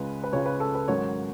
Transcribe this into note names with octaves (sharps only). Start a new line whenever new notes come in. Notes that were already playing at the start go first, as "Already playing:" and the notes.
Already playing: C#2 C#3 G#3 B4
B4
C#2 C#3 G#3 C#5
B4
A4
B4
G#2 D#3 F#3 C#4 C#5